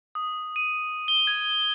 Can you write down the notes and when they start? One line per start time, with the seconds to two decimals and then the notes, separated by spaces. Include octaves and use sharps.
0.15 D#6
0.56 D#7
1.08 G7
1.27 G#6